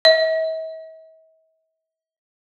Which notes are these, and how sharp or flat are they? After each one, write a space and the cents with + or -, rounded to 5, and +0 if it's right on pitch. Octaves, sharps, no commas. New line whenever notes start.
E5 -45